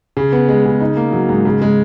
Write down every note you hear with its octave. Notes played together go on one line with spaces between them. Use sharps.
C#3
B3
G#3
C#3
D#4
A#3
F#3
G#2
C#3
G#3